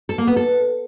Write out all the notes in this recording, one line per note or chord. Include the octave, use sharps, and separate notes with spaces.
A4
A#3
B3
A4